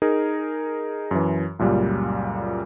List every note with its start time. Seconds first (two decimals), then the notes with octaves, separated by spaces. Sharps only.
0.02 D#4 G#4 A#4
1.11 F#2 E3
1.59 C#2 F#2 A#2 G3